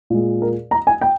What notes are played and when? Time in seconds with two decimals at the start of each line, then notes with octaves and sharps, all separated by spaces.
0.10 A#2 G#3
0.42 A#4
0.71 A#5
0.87 G#5
1.01 G5